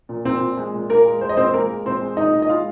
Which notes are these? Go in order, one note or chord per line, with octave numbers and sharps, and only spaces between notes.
A#2
A#2 C4
A#2
G#3
A#2
A#2 A#3 A#4
G#3
G#3 C5
D#5
A#2 C4 C5
G#3 A#3 A#4
G#3
A#2 C4 C5
G#3
A#2 D#4 D#5
A#2
D#5
G#3 F4 F5